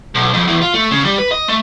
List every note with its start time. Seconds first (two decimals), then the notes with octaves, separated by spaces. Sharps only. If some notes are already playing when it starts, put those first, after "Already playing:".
0.15 B1
0.33 F2
0.47 E2
0.62 F4
0.74 A3
0.91 C#3
1.05 G3
1.18 B4
1.31 D#5
1.48 A3